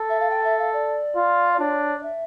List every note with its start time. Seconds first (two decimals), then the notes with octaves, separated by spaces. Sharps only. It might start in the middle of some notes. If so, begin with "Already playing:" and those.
Already playing: A4
0.09 E5
0.20 F5
0.30 G5
0.44 E5
0.59 F5
0.73 D5
1.16 F4
1.53 D5
1.59 D4 C#5
1.98 D5
2.03 E5